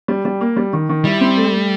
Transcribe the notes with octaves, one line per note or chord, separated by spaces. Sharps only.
G3
G3
A#3
G3
D#3
D#3
G3 E4
C4
A3
A3